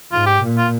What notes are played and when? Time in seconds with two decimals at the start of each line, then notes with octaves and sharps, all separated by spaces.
0.11 G#2 F4
0.26 G4
0.42 A#2
0.58 F4